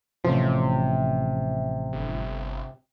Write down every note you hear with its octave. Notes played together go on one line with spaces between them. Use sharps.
A1 C3 F3
G1